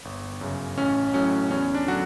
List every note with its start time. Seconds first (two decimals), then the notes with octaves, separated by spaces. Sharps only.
0.05 G1
0.41 F#2 C#3
0.78 A1 C#4
1.14 A2 F#3 C#4
1.51 E2 C#4
1.75 D4
1.87 D3 F#3 F#4